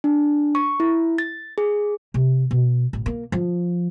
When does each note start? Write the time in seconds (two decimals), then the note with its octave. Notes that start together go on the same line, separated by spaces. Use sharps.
0.04 D4
0.55 C#6
0.80 E4
1.18 A6
1.58 G#4
2.14 C3
2.51 B2
2.93 A1
3.06 A#3
3.32 F3